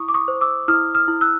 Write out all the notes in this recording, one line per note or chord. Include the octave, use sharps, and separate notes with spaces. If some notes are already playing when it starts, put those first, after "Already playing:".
Already playing: E4 C#6 D#6
D6
C#6 D#6
C5
D6 E6
E4 D#6 F6
D#6 F6
E4
E6 F#6